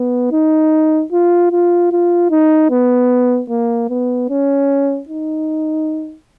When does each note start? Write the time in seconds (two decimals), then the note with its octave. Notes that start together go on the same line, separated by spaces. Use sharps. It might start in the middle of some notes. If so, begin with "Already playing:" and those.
Already playing: B3
0.32 D#4
1.12 F4
1.51 F4
1.92 F4
2.31 D#4
2.71 B3
3.50 A#3
3.89 B3
4.30 C#4
5.09 D#4